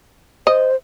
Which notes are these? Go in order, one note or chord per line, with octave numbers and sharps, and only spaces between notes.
C5 D#5